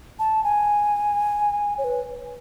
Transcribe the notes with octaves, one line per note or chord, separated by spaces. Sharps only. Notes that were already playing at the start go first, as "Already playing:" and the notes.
A5
G#5
C#5
B4